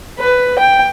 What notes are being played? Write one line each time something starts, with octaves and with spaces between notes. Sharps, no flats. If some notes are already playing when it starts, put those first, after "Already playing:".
B4
G5